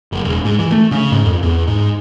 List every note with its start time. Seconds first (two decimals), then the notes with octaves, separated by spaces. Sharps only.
0.12 F#1
0.25 E1
0.45 G#2
0.59 E3
0.72 A3
0.91 C#3
1.12 G#2
1.25 F2
1.43 E2
1.67 G#2